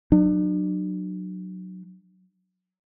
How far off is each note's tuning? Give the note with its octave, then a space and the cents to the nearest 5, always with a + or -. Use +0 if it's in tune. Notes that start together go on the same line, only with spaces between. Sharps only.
F#3 +0 D4 +40